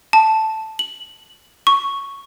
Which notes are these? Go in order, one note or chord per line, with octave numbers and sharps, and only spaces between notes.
A5
F#7
C#6